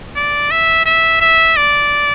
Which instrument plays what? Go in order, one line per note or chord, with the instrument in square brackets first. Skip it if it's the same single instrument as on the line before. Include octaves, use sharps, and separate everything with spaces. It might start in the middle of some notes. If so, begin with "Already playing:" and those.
[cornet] D5
E5
E5
E5
D5